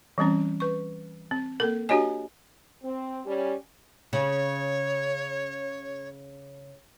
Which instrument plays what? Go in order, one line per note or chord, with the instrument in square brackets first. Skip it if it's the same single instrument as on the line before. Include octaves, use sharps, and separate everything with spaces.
[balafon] E3 G3 C4 C#4
B4 C#6
C4
A#3 A4 A#4
D4 F#4 G4 C#5 D#5 G#5
[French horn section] C4
G3 C#4
[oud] C#3 [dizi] C#5